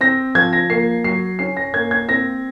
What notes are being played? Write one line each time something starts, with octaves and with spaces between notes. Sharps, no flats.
C4 A#6
F3 G#6
A#6
A#3 C7
F#3 C7
C#4 C7
A#6
A#3 G#6
G#6
C4 A#6